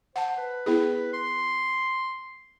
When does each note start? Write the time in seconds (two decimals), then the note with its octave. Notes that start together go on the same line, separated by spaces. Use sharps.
0.16 C5 F#5 A5
0.38 B4
0.66 B3 E4 G#4
1.13 C6